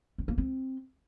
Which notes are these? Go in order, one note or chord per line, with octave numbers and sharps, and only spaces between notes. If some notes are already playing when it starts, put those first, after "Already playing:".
C4
A#3
C4